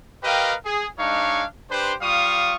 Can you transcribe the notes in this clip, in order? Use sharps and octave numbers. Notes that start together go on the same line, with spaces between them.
G4 A#4 B4 D#5 F5 G5
G#4
G#3 D4 D#4 C#5 F5 C#6
D4 G4 B4 C5
G3 F4 F5 C#6 D#6